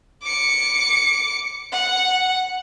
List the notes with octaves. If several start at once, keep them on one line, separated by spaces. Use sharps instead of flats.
D6 C#7
F#5